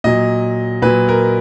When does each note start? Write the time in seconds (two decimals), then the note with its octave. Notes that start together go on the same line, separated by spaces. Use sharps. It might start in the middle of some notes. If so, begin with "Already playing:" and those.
0.04 A#2 F#3 D#5
0.82 A#2 F#3 B4
1.09 A#4